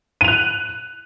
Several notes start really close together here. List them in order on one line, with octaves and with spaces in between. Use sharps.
D#7 F7 F#6